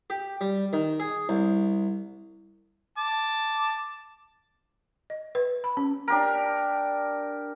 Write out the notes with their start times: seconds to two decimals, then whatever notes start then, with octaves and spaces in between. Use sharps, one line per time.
0.10 G4
0.41 G3
0.73 D#3
1.00 G#4
1.29 C2
2.98 A5 D6
5.10 D#5
5.35 B4
5.64 B5
5.77 C#4
6.08 D4 G4 A#4